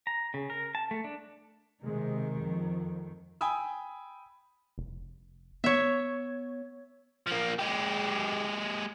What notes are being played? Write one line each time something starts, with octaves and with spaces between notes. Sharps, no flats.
A#5
C#3
A#4
A5
A3
D4
C3 D#3 G#3
F2
G5 G#5 B5 D#6 E6
F1
B3 C#5 E5
F3 A#3
G#3 G4